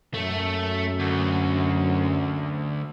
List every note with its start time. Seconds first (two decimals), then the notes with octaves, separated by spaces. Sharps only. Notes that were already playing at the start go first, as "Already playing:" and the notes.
0.14 F#2 A3
0.99 D2